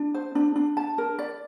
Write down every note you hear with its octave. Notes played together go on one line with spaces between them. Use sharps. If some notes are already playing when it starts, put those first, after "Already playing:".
Already playing: D4
C5
D4
D4
A5
A#4
D5